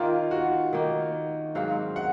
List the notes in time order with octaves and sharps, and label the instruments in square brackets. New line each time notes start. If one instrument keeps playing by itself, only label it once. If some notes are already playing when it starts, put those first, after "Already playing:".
Already playing: [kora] D#3 A#3 D#4 [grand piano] F4
[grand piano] F#4
[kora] D#3 A#3 D#4
[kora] G#2 F#3 C4 F#4 [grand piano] F5
[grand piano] F#5